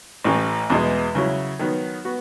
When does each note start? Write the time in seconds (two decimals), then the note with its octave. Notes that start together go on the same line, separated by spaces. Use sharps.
0.24 A1 A2 E3
0.70 E2 B2 G#3
1.15 C#3 F#3 C#4 E4
1.59 D#3 F#3 B3
2.05 B3 F#4